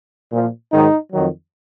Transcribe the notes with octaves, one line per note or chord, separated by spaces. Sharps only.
A#2 F3
G#2 D#3 F#3 D#4
F2 D#3 F#3